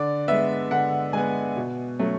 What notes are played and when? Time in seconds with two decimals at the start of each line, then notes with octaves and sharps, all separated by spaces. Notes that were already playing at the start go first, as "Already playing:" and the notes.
Already playing: D3 D5
0.28 G#3 B3 E5
0.71 D3 F#5
1.13 G#3 B3 G#5
1.56 B2
1.99 F#3 A3 C#4